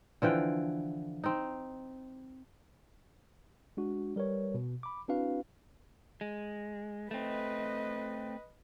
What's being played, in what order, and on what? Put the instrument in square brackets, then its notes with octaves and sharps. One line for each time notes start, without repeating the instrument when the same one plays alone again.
[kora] D3 E3 F3 G5
C4 D#4
[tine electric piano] G#3 D4 F#4
G3 A#4 B4 C#5
B2
B5 D6
C4 D4 E4 F#4 B4 F5
[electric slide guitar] G#3
[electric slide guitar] A3 C4 [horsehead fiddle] B4 D#5